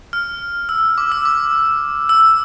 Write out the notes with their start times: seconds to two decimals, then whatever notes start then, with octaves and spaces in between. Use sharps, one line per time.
0.13 F6
0.69 E6
0.98 D6
1.12 E6
1.25 D6
2.09 E6